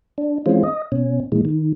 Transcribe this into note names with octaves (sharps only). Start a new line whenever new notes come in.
D4
E3 G#3 C4 C#4 F4
D#5
B2 C#4
A#2 E3 G#3
D#3